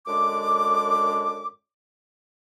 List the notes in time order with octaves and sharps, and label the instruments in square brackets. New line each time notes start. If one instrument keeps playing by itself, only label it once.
[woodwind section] F#2 D3 G#3 D4 D6